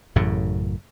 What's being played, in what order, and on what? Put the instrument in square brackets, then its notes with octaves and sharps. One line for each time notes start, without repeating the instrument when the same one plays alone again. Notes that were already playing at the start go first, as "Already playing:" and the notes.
[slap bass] A1 F#2 A2 C#3